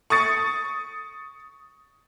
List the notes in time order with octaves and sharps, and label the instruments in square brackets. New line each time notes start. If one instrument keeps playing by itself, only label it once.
[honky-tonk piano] C#6 D#6 A6 C#7